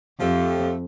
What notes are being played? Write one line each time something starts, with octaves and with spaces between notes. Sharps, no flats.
F2 F3 A3 G4